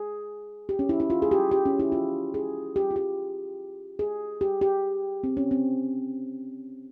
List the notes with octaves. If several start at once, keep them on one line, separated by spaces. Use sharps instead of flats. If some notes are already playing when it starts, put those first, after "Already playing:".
Already playing: G#4
G4
C#4
E4
E4
F4
G#4
G4
G4
C#4
E4
F4
G#4
G4
F4
G4
G#4
G4
G4
C4
C#4
C4